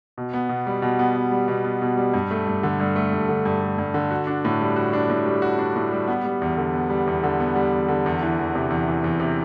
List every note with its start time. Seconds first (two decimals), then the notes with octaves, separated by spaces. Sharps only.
0.18 B2
0.34 B3
0.49 B2
0.67 G3
0.82 B2
0.99 B3
1.16 B2
1.32 G3
1.48 B2
1.64 B3
1.82 B2
1.97 G3
2.14 G2
2.31 A3
2.47 G2
2.63 D3
2.80 G2
2.96 A3
3.13 G2
3.29 D3
3.45 G2
3.62 A3
3.78 G2
3.94 D3
4.11 F#4
4.27 D4
4.45 A2
4.61 G3
4.76 F#4
4.93 D4
5.10 A2
5.26 G3
5.42 F#4
5.59 D4
5.76 A2
5.91 G3
6.08 B3
6.25 G3
6.42 E2
6.57 D3
6.74 B3
6.90 G3
7.07 E2
7.23 D3
7.40 B3
7.55 G3
7.73 E2
7.88 D3
8.06 E2
8.22 E3
8.39 E2
8.55 C3
8.70 E2
8.88 E3
9.04 E2
9.20 C3